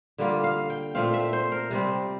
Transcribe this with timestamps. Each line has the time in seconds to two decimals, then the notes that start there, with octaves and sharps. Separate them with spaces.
0.18 D3 G3 A#3 F4
0.44 F5
0.70 G5
0.95 A#2 A3 C4 F5
1.14 E5
1.33 C5
1.52 A#4
1.71 C3 G3 C4